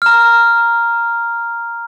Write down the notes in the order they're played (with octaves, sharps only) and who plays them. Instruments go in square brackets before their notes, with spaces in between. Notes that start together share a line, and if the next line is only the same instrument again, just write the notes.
[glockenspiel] A#5 F6